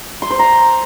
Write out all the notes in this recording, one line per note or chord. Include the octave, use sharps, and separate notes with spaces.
C6
C5
A#5